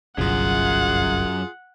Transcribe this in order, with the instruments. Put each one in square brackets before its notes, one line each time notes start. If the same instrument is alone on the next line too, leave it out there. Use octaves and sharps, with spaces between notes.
[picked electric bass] G1 C2 [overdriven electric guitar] F#2 [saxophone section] F4 G#4 [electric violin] F#5